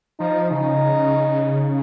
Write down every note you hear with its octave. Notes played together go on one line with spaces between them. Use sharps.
F3 D#4
C#3 D#4